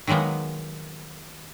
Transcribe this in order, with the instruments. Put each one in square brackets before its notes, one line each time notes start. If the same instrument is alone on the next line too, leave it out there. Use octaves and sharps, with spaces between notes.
[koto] D#3 F#3 G#3 A#3 B3